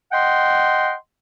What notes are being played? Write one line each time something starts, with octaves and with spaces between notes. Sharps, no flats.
D#5 F#5 G5 C6